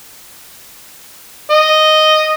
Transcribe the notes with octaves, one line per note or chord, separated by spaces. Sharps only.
D#5